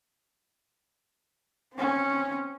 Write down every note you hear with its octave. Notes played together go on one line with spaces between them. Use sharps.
C4 C#4